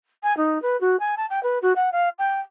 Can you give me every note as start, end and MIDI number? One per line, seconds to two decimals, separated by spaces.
0.23 0.36 80
0.37 0.61 63
0.62 0.79 71
0.81 0.99 66
1.00 1.15 80
1.17 1.26 81
1.30 1.43 79
1.43 1.59 71
1.62 1.73 66
1.76 1.92 78
1.92 2.09 77
2.19 2.40 79